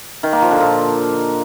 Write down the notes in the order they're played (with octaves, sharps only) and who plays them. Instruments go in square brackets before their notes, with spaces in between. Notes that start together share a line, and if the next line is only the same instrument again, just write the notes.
[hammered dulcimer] D#3
A#3
F3
D3
A#2